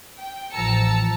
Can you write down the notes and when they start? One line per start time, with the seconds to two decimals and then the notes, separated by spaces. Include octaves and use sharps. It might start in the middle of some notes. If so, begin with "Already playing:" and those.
0.19 G5
0.53 A1 F3 A5 A#5 E6 C#7